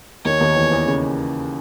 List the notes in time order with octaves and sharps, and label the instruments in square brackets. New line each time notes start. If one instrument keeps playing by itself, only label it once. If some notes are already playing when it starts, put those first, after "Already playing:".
[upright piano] D#2 D#3 [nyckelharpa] C#5
[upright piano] D#2 D#3
E2 E3
E2 E3
C#3